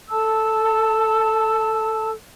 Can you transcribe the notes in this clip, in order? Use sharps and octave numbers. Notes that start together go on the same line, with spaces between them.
A4 A5 E6